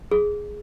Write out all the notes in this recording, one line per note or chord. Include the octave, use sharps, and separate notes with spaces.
G#4